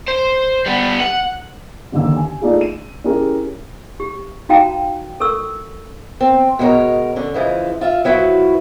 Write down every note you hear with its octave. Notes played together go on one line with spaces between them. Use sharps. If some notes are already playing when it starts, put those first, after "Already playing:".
C5
G3 B3
F#5
F#1 D#2 D3 A#3 E6
G#5
A3 D4 D#4 F4 G#4
D#7
C#4 E4 G4 G#4 A#4
G4
D#4 F#4 F5 G5 A5 A#5
A4 A#4 C#6 E6
C4
B2 G#3 F#4 A#4 C#5 A#5
D3 C#4
C#3 E3 F3 G#3
F4 E5 F5
F3 F#3 E4 F#4 B4